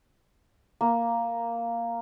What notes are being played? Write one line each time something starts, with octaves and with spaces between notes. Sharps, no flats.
A#3